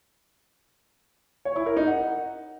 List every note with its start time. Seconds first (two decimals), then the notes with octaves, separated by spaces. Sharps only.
1.45 C#5
1.56 E4
1.66 A#4
1.77 D#4
1.87 F#5